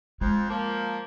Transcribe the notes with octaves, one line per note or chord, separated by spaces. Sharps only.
F2 G#3 C5
F3 A#3